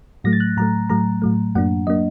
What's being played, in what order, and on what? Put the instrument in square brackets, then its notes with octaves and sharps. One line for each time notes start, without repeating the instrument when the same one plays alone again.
[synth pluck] A2 F#3 A3 A#6
A6
F#6
A2 F#3 A3 A#5
A2 F#3 A3 A#5
A2 F#3 A3
F#2 F#3 A#3 D4 F#5
F#3 A#3 D4 D#5